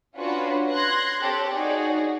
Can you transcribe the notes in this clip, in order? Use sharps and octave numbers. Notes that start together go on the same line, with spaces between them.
C#4 D4 F4 F#4 B4 C#5
C6 F#6 G#6 A#6
C4 G4 A4 C#5
D#4 F#4 G#4 C#5 D5